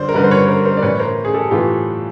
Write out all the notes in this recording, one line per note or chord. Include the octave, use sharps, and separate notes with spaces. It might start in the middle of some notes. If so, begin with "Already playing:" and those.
Already playing: G2 D3 C5 D5
A#4
G2 D3 B4
C5
B4 C#5
A#4 C5
A#4 C5
D5
A2 E3 B4 C#5
A#4 C5
G#4
G4 A4
A2 E3 F4 G4